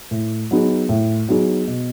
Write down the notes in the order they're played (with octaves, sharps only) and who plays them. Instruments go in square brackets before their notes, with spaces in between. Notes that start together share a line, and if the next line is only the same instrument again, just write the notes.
[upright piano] A2
F#3 B3 D#4 G#4
A2
F#3 B3 D#4 G#4
B2